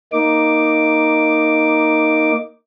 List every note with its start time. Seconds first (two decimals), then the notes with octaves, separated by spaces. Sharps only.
0.12 A#3 D#4 D6